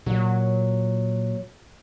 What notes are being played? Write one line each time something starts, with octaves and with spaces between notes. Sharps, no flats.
A#2 F#3